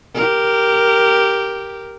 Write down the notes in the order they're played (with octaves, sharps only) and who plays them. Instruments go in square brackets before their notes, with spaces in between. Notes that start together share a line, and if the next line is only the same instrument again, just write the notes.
[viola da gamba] G4 A#4